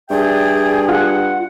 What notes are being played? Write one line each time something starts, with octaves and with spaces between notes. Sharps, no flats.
G2 G#4 D5 E5 G5
F4 F#5